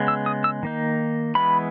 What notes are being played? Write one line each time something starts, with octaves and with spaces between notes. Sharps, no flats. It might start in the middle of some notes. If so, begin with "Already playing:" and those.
Already playing: C#3 G#3 B3
E6
D#6
E6
D#3 A#3 D#4
E3 G#3 B3 B5